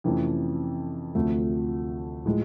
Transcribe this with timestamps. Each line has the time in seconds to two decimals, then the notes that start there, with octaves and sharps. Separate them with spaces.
0.04 F2 C3 E3 A3 C#4
1.15 D2 C3 F3 A3
2.26 A2 F3 G#3